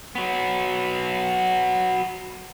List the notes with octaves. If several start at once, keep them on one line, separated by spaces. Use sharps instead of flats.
F#3 B3